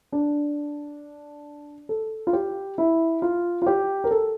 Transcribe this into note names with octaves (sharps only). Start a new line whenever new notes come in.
D4
A4
F4
G4
E4
F4
F4
G4
A#4
A4